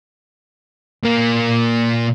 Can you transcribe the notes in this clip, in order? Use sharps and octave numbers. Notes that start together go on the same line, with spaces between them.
A#2 A#3